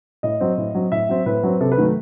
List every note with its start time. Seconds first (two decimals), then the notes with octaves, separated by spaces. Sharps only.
0.23 A2 D#5
0.41 F#3 C4
0.58 A2
0.75 F#3 C4
0.92 A2 E5
1.09 F#3 C4
1.26 A2 B4
1.43 F#3 C4
1.61 C3 A4
1.72 B4
1.77 D#3 F#3 A3